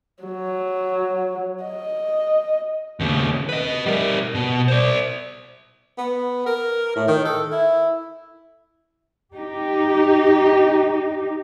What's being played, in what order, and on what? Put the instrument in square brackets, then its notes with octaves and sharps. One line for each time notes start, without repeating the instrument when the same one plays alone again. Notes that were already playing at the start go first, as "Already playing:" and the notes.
[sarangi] F#3
D#5
[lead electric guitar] D#2 C#3
B4 D#5
G3 A#4
B2
C5 D5
[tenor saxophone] B3
A#4
A2
D#3
A4
E4
[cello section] D#4 G4